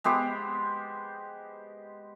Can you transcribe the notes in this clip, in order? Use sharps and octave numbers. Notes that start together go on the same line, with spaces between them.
G#3 B3 G4 C5